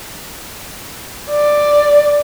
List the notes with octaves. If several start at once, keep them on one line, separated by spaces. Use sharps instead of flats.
D5